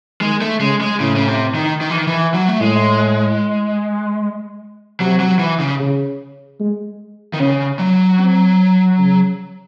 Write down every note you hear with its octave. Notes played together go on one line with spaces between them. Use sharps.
D#3 G#3
A3
C#3 G#3
G#3
A2 C#3
C#3
C3
D#3
D#3
E3
D#3
E3
F#3
A3
A2 G#3
C3 F#3
F#3
E3
C#3
C#3
G#3
D#3
C#3 C#4
F#3
C4
C#3